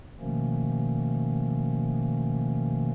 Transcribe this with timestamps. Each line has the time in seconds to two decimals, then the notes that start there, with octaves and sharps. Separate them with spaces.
0.20 B2 D#3 F3 A3 A#3 C#4